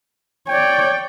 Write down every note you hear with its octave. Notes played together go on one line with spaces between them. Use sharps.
C#5 D5 G5